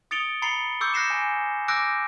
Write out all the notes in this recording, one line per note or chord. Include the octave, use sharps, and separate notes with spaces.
D#6 A6 C#7 D7 F7 G7
A#5 B5 A6 C7 C#7 G7
C#6 D6 E6 G6 C#7
F#6 A#6 C7 E7
G#5
D6 E6 F#6 G6 A#6 D7